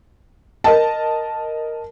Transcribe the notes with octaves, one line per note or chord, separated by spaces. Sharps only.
A#4 D#5 A5